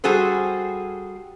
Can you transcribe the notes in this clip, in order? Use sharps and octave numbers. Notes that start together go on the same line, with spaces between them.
G3 F#4 G#4 A4 C5